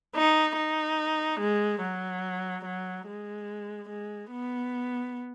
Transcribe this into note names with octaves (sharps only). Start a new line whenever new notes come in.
D#4
D#4
G#3
F#3
F#3
G#3
G#3
B3